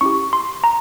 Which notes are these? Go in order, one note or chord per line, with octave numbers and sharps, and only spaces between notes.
C#4 E4 G4 C#6
C6
A#5